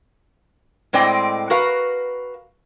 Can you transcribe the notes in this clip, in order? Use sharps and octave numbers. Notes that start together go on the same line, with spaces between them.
A2 G#3 C4 D5 D#5 G5
F#4 A#4 B4 F5